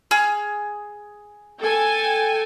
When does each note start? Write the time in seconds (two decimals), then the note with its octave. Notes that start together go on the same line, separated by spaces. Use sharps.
0.11 G#4 F6
1.60 A4 G5 G#5